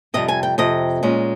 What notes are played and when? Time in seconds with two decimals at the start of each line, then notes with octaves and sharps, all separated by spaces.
0.14 F2 C3 G3 D#5
0.28 G#5
0.43 G5
0.58 F2 C3 D#5
1.03 A#2 G#3 C#4